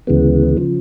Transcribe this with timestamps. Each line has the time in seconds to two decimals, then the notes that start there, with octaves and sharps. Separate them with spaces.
0.07 D2 C#3 E3 G#3 B3
0.57 C#3 F3